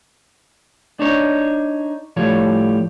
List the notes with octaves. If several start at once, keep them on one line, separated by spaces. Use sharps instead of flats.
D4 D#4 C#5
A2 F3 G3 C#5